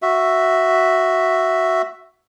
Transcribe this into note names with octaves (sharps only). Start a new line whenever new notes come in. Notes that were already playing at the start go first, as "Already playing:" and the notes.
F#4 E5